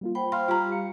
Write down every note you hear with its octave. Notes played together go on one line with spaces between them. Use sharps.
G3 A#3 F4
C5 F#5 G5 B5
F5 C6
G3 F4 G4 A#5 C#6
C#7